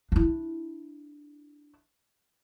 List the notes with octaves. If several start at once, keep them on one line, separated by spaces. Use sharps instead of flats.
D4 E4